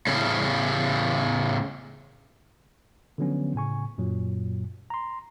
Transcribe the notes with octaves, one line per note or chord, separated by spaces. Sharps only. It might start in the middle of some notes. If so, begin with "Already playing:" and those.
A2 C#3
D3 F3 F#3 B3 C#4
A2 C#3 G#5 C#6
F#2 A#2 F#3
A#5 C6